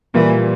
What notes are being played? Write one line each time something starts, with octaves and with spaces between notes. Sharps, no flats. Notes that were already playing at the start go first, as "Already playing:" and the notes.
A#2 E3 G3 A#3